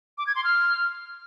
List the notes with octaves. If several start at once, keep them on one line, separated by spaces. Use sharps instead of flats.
D6
G#6
C6
F6